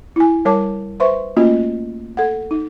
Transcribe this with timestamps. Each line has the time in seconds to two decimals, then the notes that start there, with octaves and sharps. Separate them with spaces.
0.16 E4 G#5
0.45 G3 A#4 C#5 A5 D6
1.00 B4 C5 E5 C6 C#6
1.37 A3 A#3 C#4 F4 F#4 D#5
2.17 A4 F#5
2.51 D#4